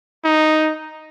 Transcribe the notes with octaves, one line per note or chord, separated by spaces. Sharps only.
D#4